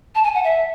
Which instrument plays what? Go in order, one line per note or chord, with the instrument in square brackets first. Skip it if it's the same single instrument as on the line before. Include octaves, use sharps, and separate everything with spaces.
[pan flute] A5
G#5
F#5
E5